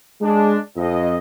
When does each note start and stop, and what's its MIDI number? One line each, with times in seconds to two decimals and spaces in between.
0.22 0.57 56
0.22 0.57 62
0.77 1.17 41
0.77 1.17 75